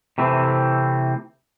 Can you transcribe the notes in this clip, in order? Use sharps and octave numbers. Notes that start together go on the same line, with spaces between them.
C3 E3 A3 C4